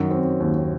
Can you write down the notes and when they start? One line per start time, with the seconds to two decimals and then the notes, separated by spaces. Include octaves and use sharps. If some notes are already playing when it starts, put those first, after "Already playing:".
Already playing: F#2 D#3 F#3
0.11 C4
0.40 D#2